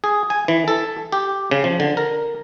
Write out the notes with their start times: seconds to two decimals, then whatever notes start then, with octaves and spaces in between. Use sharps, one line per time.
0.04 G#4
0.30 G#5
0.48 E3
0.68 A4
1.12 G4
1.51 C#3
1.64 F3
1.80 D3
1.97 A#4